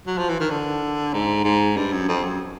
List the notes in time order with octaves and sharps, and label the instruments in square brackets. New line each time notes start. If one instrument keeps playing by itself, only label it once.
[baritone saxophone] F#3
F3
E3
D#3
D3
G#2
G#2
G2
F#2
F2
F#2